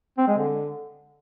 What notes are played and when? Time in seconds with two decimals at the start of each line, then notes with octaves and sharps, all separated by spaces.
0.18 C4
0.28 G#3
0.37 D3